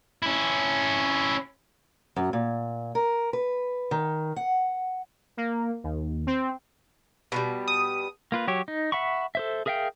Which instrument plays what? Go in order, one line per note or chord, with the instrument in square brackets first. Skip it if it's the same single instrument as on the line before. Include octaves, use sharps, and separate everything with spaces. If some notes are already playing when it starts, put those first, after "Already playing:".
[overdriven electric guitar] C#4 E4
[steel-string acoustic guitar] F#2
A#2
A#4
B4
D#3
F#5
[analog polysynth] A#3
D#2
C4
[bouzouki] B2 F3 G3
[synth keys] D#6
[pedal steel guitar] A#3 F4 B4
F#3 G4 C#5
D#4
E5 F#5 B5 C#6
A4 C5 E5
G#4 A#4 E5 F5 G5